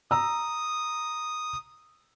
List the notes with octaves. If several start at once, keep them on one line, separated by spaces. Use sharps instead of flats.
A#5 D#6 E6